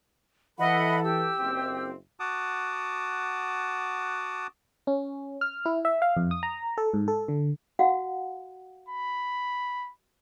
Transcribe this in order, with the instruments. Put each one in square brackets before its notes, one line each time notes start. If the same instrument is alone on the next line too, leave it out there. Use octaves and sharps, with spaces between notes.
[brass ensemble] E3 A4 [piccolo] D#5 [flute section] E5 F#5 B5
[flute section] G4 [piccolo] E6
[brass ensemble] F#1 C4
[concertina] F#4 F#5 A5 D6 D#6
[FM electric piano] C#4
F6
E4
E5
F5
F2
D#6
A#5
A4
G#2
A4
D3
[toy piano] F#4 F5 F#5
[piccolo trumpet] B5